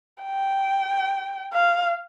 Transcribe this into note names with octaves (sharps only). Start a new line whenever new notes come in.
G5
F5